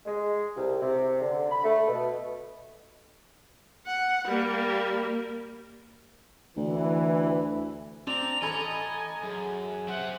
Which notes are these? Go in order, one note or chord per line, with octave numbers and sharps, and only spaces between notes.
G#3
C2
C3
D3
B5
A3
B2
F#5
G3 A#3
D2 E3
C4 D4 A#5 F7
A1 A4 D#5 G#5 B5
F#2 G#4
C5 E5 F#5